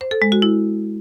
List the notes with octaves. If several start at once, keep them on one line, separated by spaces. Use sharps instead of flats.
C5
A4
G#3
F#4
E4